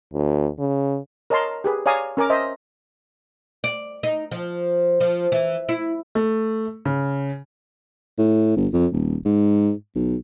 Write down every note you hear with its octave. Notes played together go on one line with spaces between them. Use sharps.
D2
C#3
A#4 C#5 D#5 A5 A#5 C6
G4 G#4 B4
C#5 D5 F5 G#5 A#5 D#6
C#4 A#4 G#5 D6
C5 D#5 E5
D5
D#4
F3
F3
E3
E4
A3
C#3
A2
G1
F2
D#1
G#2
B1